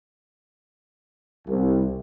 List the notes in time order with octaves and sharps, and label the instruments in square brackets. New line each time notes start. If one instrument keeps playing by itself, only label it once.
[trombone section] C2